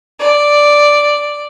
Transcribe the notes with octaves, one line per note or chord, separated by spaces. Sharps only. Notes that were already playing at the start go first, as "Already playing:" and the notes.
D5